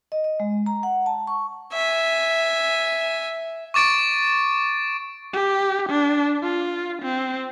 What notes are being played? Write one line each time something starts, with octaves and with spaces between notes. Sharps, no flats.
D#5
D#5
G#3
A#5
F#5
A5
C#6
E5 G#5
C#6 D6 A6 D7
G4
D4
F4
C4